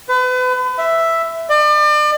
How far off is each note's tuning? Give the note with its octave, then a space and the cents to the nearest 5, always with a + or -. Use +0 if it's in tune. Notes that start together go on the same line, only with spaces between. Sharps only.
B4 +35
E5 +0
D5 +35